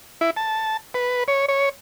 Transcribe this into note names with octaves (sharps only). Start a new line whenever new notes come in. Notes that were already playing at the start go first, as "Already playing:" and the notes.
E4
A5
B4
C#5
C#5